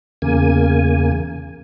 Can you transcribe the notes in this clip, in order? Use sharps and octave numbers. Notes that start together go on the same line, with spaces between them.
E2 C#3 A#3 G#5